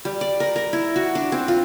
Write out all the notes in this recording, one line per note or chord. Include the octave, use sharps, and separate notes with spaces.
G3
D5
A#4
A#4
E4
F#4
D4
C4
F4